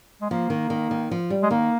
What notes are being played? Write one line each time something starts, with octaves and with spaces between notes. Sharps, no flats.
G#3
F3 A#3
D#3
D#3
D#3
F3
G3
G#3
D#3 A#3